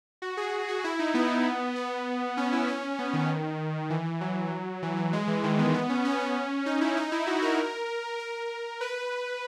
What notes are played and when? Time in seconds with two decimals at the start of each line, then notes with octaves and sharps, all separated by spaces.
0.22 F#4
0.37 G#4
0.69 F#4
0.84 E4
0.99 D#4
1.14 B3
1.76 B3
2.37 C#4
2.52 E4
2.68 C#4
2.99 B3
3.13 D#3
3.90 E3
4.06 E3
4.21 F#3
4.82 E3
4.97 E3
5.13 G#3
5.28 E3
5.44 D#3
5.59 B3
5.74 B3
5.89 C#4
6.05 C#4
6.20 C#4
6.66 D#4
6.81 E4
6.97 D#4
7.12 E4
7.27 F#4
7.42 A#4
8.19 A#4
8.81 B4